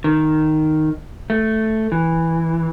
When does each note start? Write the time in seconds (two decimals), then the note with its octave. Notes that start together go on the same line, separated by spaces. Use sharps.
0.04 D#3
1.30 A3
1.92 E3